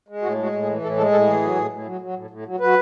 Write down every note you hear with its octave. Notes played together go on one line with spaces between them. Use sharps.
G#3
A2 F#4
G#3 F#4
A2
G#4
E3
A2 A4
G#3 A4
A2 A4
E3 G#4
F#3
A2
A2
F#3
F#3
A2
A2
F#3
F#3 B4